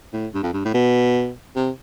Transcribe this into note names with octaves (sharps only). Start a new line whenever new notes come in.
A2
G2
F2
G2
A2
B2
C3